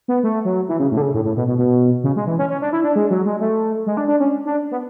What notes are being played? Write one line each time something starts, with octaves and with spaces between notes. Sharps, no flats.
B3
A3
F#3
E3
C#3
A2
D3
C#3
A2
A2
B2
B2
B2
C#3
G#3
E3
C#4
C#4
D4
E4
D4
G#3
F#3
G#3
A3
G#3
D4
D4
C#4
D4
B3